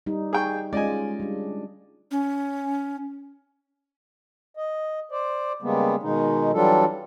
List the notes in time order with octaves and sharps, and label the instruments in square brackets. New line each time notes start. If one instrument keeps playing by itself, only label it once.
[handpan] G3 D#4
[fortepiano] G#4 G5 C#6
[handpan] G#3 C#4 F4 [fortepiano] D5 D#5 G#5
[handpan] G3 D4
[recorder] C#4
[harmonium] D#5
C5 D5
C#3 G3 G#3 A#3 B3
B2 D#3 G#3 D#4
E3 F#3 G3 D4 F4 A4